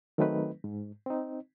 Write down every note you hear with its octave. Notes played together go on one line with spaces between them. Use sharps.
D#3 F#3 A3 C4 D#4 B4
G#2
C4 D#4